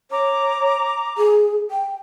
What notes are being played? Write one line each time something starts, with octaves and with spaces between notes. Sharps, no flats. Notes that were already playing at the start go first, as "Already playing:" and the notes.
C#5 A#5 D6
G#4
G5